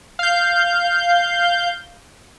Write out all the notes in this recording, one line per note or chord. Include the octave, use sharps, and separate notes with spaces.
F5 G6